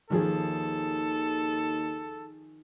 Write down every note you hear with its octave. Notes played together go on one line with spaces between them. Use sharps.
D#2 D#3 F3 G#4 A4